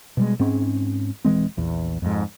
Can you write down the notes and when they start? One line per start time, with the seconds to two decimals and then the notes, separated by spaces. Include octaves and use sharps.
0.17 B2 G3 G#3
0.39 G#2 C4 C#4
1.25 D#1 E3 G#3 C4
1.57 A#1 E2
2.02 F2 G#2